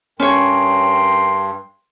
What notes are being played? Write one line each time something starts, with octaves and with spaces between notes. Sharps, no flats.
G2 C#4 A#4 C#5 G5 C6